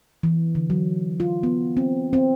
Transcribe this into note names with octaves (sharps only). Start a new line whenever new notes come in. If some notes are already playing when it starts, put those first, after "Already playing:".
E3
D3
F#3
F4
B3
C4
C4